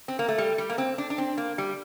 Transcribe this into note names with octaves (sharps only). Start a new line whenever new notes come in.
C4
A#3
A3
G3
G3
A#3
C4
D4
D4
C4
A#3
G3